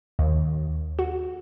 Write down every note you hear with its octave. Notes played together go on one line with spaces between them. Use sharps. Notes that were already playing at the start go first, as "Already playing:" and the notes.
D#2
F#4